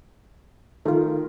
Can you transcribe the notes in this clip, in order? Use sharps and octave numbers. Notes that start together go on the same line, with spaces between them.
D#3 A3 F4